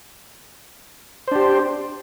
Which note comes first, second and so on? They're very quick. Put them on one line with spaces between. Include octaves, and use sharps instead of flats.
C5 D4 G4